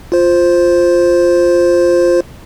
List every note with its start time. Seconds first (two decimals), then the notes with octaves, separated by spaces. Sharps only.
0.12 F4 C5